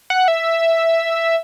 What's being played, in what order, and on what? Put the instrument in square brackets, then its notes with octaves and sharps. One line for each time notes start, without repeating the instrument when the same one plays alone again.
[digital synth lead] F#5
E5